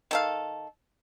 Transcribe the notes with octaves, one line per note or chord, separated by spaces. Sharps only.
D#3 A4 F5